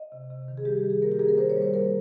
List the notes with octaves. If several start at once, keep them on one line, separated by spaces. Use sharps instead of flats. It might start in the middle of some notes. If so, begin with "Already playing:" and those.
Already playing: D#5
C3
C3
D#3
G#4
G3 G4
G4
D#3
G#4
A#3 A#4
G4
A#3 G#4
A#4
D#3 C5
C#5
G3
C5
A#3 A#4